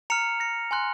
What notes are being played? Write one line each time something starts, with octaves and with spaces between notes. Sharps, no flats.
A#5 F6 C#7 F7
A#6 C#7
G#5 C6 F#6